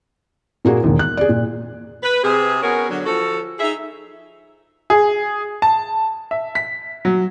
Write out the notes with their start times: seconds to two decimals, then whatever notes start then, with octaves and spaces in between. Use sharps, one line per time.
0.65 A#2 A#3 F#4 G#4
0.84 E1 D#2
0.99 F#6
1.17 G#4 D5
1.29 A#2
2.03 B4
2.23 C3 G#4
2.62 B3 C#4 F#4 G#4 A#4
2.89 D3 F#3
3.06 F3 F#4 A4
3.59 D#4 G#4 E5
4.90 G#4
5.62 A5
6.31 E5
6.55 B6
7.05 F#3